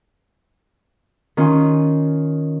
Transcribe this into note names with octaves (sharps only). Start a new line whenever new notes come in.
D#3 C#4 F4